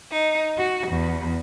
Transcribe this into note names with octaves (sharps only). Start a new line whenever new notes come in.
D#4
F#4
E2